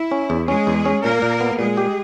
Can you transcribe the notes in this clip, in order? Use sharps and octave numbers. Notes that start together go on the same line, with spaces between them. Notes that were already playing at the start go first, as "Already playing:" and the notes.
Already playing: E4
C#4
E2
G#3 C#4 G#4
E2
C#4
A#2 A#3 A#4
A#2
B3
A#2 G#3 G#4
G4